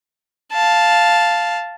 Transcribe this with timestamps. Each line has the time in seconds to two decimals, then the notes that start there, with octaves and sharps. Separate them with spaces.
0.52 F5 A5